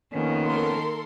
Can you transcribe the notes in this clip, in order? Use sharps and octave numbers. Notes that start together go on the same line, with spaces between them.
F2 D#3 A#3 B3 C#4
A4 A#4 C6